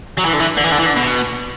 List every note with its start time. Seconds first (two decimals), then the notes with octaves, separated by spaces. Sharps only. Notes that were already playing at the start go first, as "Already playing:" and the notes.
0.18 F#3
0.26 E3
0.34 D3
0.40 E3
0.57 D3
0.64 E3
0.72 D3
0.79 E3
0.86 D3
0.97 B2